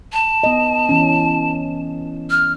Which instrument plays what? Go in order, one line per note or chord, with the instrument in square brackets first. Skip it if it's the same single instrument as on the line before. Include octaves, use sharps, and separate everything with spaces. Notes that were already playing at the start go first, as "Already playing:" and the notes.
[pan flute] A5
[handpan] B3 D#5
E3 C#4
[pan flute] F6